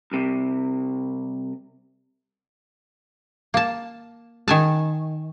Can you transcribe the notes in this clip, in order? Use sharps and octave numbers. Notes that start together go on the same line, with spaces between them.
C2 C3
A#3 A5
D#3 G#5 A5